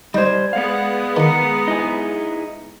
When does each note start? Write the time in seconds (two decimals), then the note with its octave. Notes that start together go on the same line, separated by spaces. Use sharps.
0.14 G3 D#4 C5 D5 G6 G#6
0.53 G#3 B3 F5 F#5
1.17 D#3 A#5 C#7
1.68 D#4 E4 G#4